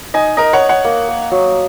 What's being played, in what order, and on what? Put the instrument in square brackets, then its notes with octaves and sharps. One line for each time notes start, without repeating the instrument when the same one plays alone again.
[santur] D#4 [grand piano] D#5 G#5
[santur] D#4 [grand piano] A#4 D#5
[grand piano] C#5 F#5
[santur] D#4
[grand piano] C#5 F#5
[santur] A#3
A#3
F#3